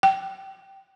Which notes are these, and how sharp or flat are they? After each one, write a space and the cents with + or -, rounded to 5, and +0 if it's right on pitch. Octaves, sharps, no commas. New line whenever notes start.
G5 -15